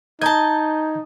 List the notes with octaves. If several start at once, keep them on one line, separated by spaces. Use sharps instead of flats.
D#4 D#5 A5 A#5 G6 G#6